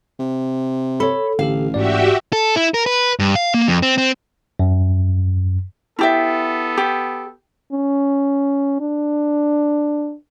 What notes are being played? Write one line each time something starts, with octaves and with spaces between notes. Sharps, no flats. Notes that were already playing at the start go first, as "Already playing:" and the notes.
C3
A4 C#5 B5
A1 D3 G4 A4 F5
G#2 F#4 G4 D5 E5
A4
E4
A#4
B4
G2
F5
A#3
F2
C4
C4
F#2
B3 E4 G4 A4 E5
G4
C#4
D4